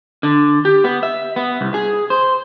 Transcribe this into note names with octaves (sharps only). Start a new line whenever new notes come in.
D3
G4
B3
E5
B3
C2
G#4
C5